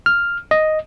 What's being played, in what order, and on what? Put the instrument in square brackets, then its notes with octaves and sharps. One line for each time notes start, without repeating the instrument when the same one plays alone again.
[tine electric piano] F6
D#5